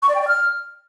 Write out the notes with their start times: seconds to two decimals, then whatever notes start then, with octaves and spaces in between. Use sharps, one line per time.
0.02 C#6
0.09 D5
0.15 G5
0.21 D5
0.28 F6